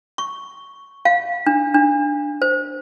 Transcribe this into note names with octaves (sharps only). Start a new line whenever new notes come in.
C#6
F5
D4
D4
C5